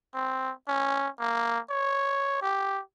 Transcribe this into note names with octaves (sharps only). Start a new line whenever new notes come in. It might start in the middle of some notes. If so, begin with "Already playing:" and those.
C4
C#4
A#3
C#5
G4